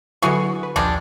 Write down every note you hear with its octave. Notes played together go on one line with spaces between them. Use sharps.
D3 F#3 B3 E4 G#4 C#6
B4
A#1 D#2 G3 G#3 D4